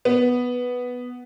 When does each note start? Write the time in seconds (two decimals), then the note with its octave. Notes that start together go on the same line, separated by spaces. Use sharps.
0.05 B3